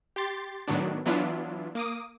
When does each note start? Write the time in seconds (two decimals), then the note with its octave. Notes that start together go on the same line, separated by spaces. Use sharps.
0.16 G4 C6 A6
0.68 A2 D#3 F#3 B3 D4
1.06 E3 F#3 B3 D4 E4 F4
1.75 A#3 D6 D#6